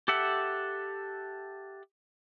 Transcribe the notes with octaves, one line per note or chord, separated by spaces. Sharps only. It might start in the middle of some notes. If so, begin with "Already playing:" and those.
G4 A4 E5 F#5